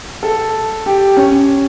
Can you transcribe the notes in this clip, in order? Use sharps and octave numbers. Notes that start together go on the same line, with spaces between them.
A4
G4
C#4